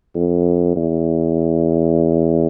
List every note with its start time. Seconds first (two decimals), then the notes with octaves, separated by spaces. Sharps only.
0.15 F2
0.76 E2